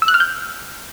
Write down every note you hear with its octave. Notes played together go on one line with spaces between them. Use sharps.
E6
F#6
F6
G6